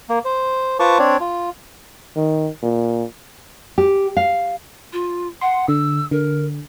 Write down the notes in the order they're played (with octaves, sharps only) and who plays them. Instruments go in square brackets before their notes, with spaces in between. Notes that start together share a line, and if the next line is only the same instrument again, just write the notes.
[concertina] A#3
C5
F4 B4 C5 A5 C#6 D6
C4 D4 C#5 D5
F4
[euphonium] D#3
A#2
[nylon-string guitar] G4
F5
[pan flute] F4
[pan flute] F#5 [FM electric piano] C6
[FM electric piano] D3 [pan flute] E6
[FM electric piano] D3 [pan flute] A#4